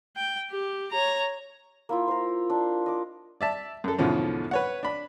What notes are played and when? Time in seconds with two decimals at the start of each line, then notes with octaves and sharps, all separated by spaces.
0.16 G5
0.51 G4
0.91 C#5 A#5
1.89 A#3 E4 F4
2.08 A#4 C5
2.50 D4
2.86 D#5 D6
3.41 D5 E5 A5
3.84 F#2 A4
3.99 E2 G#2 B2 D3 F3 C#4
4.51 B4 C#5 F#5
4.83 D4 B5